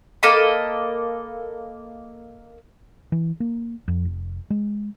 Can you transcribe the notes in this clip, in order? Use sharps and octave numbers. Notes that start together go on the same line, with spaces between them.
A#3 A4 D#5 B5
E3
A#3
F2
F1
G#3